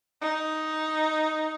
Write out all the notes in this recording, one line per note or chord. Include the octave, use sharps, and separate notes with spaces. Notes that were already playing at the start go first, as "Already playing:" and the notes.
D#4